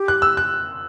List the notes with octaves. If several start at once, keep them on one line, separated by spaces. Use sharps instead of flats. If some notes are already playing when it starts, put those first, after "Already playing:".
Already playing: G4
F#6
E6
F#6